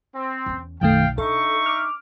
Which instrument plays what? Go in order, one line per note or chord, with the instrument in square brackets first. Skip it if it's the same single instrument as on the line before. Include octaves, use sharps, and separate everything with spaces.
[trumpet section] C4
[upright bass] E2 C#4
[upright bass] B1 [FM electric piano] F#2 D#3 A3 [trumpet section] F5 G5
[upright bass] D4 [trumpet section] D#4 E5 C#6 [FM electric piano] A4
[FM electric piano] D6 F6